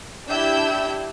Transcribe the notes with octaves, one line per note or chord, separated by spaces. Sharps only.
D4 E4 G4 E6 G6